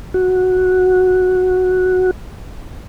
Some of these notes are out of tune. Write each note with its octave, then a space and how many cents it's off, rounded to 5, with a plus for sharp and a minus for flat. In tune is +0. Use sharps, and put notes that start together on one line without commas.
F#4 -5